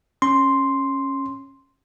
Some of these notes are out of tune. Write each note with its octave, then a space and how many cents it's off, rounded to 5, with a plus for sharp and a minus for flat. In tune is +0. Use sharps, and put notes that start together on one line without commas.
C#4 -15 C6 +0